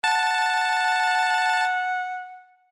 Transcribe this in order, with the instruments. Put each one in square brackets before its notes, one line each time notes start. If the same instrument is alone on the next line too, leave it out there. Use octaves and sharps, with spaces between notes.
[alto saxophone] F#5 [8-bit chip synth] A5